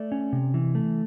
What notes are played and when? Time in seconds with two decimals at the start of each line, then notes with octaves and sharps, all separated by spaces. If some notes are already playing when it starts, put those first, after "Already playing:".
Already playing: A3 D5
0.12 C#4
0.33 C3
0.54 E3
0.75 A3